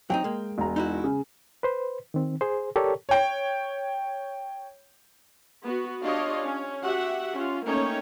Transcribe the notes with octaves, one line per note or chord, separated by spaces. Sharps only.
F#3 C4 D#4 G5
G#3 A#3
E1 A#5
D#4 E4 F#4
C#3
B4 C5
D#3 C4
G#4 C5
G4 A4 A#4 C#5 D5
C#5 G5
B3 F#4
D4 F4 G4 C#5 D#5 F5
C#4
F#4 G4 E5 F#5
C#4 F4
A3 A#3 C#4 D#4 C#5 G5